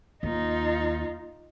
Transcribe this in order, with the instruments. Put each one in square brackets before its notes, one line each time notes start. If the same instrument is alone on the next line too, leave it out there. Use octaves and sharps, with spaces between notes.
[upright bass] D#2 [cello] D#4 F4